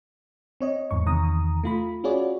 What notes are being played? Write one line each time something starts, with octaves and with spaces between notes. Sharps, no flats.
C4 C#5 D#5
E2 G#2 C#6
E2 C3 D#3 A#5 D#6
A3 F4 B5
C#4 F4 F#4 G#4 C#5 D5